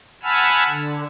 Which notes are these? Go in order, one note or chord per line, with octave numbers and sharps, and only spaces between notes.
F#5 G#5 A5 B5 E6 F6
D3